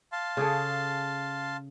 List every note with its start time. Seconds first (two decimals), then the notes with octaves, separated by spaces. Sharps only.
0.12 F5 A5 C6
0.37 C#3 G#4 A4